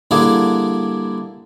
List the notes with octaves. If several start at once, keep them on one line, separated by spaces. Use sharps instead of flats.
D3 G3 A#3 D4 E4 G#4